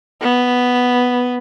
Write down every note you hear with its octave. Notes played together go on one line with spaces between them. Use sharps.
B3